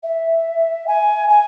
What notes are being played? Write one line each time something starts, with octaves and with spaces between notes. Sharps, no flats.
E5
G#5
G#5